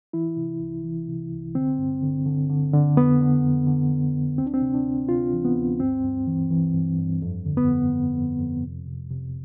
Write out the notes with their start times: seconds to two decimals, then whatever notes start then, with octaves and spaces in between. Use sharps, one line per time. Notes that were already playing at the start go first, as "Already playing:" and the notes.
0.13 E3 E4
0.37 C3
0.60 C2
0.84 E3
1.08 C3
1.32 C2
1.55 D3 C4
1.78 G2
2.02 D3
2.25 D3
2.49 D3
2.73 D3
2.97 F2 B3
3.21 D3
3.44 F2
3.67 D3
3.90 D3
4.15 F2
4.38 D2 C4
4.46 D4
4.54 C4
4.62 C3
4.74 D4
4.85 D2
5.09 C3 F4
5.33 E3
5.44 B3
5.56 D2
5.80 G2 C4
6.03 G2
6.27 E3
6.50 E3
6.74 G2
6.98 G2
7.22 F2
7.46 D3
7.57 B3
7.68 F2
7.93 F2
8.15 F2
8.40 F2
8.63 C3
8.87 C3
9.10 C3